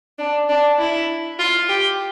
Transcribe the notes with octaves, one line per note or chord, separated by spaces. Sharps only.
D4
D4
E4
F4
G4